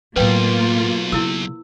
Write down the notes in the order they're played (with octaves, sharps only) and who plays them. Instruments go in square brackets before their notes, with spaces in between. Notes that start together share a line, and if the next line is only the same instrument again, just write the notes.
[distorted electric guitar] B1 [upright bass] A2 F#3 [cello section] A#3 F4 [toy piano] B4 G5
[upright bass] C#3 [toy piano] E4 E6